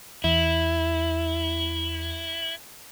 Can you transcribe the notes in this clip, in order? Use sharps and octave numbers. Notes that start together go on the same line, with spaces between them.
E2 E4